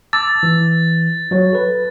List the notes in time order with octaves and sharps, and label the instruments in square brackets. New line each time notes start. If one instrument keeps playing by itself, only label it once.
[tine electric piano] A5 D6 E6 [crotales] A6
[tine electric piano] E3
F#3 C#5
A4 B4